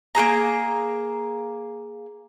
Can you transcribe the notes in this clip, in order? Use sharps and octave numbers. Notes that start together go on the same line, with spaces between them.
A#3 F#4 G#4 A#5